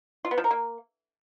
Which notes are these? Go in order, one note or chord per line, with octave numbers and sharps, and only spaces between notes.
F4
B3
F3
A#4
A#3